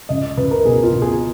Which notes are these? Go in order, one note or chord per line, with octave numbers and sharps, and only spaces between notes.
C#2 D#5
C#2 B4
A#4
B2 G#4
F4
B2
G#4